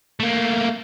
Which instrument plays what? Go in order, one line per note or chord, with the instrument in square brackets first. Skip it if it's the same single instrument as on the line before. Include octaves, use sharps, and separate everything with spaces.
[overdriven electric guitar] A3 A#3